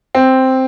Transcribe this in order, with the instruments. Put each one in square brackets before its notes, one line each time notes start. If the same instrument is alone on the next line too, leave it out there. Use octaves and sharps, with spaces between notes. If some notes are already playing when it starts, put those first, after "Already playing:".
[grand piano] C4